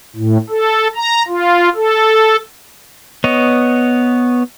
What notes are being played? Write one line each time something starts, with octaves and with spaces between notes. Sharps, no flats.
A2
A4
A#5
F4
A4
B3 C#5 D#5